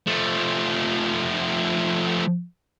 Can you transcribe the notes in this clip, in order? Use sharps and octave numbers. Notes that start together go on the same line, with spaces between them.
F3 A3